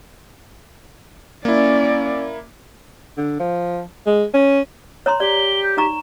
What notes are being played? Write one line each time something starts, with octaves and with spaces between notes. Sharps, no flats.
A#3 C#4 E4 D5
D3
F3
G#3
C#4
C#5 A#5 C6
G4 D5 G7
G6
D#4 A#5 C#6 E7